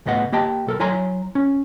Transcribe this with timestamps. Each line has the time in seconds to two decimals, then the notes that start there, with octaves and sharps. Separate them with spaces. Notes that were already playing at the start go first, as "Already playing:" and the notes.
0.06 C#2 A2 B3 D#5 F#5
0.32 A#3 G4 D#5 G5 A5
0.67 B1 A4 A#4
0.79 F#3 E4 C#5 G#5 A#5 C6
1.35 C#4